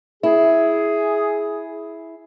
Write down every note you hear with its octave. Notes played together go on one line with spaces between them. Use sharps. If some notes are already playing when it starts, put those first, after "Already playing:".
E4 G#4